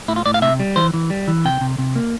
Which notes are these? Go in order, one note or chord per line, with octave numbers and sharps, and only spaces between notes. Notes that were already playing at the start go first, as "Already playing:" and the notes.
A2 E4
F4
A2 D5
F5
C3 E5
G3
E3 C5
E3
G3
E3
C3 G5
C3
C3
A#3